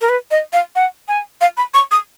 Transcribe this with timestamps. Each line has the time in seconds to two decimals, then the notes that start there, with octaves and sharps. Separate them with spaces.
0.01 A#4
0.09 B4
0.31 D#5
0.53 F5
0.76 F#5
1.08 G#5
1.41 F5
1.57 B5
1.74 C#6
1.91 D#6